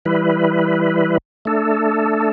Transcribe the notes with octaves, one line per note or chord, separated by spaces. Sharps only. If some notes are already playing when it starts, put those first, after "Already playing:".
E3 G3 E4 B4
A3 D4 A4